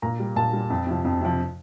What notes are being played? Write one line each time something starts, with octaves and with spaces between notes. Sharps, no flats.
A#2 A#5
G3
A#2 A5
G3
F2
C3 F3
F2
C3 F3